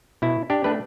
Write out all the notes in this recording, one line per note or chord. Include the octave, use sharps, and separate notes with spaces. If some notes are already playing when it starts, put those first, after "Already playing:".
B2 E4
D4 G4
A3 D4 B4